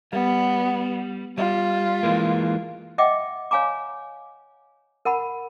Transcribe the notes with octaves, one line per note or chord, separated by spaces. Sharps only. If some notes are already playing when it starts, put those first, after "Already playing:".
G3 B3
G3 F4
E3 G#3 A#3
D#5 E5 F#5 G5 D6
C#5 F5 G#5 A#5 D6
A#4 F#5 A5 B5